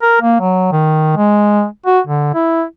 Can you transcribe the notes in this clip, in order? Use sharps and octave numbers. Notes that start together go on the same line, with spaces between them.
A#4
A#3
F#3
D#3
G#3
F#4
D3
E4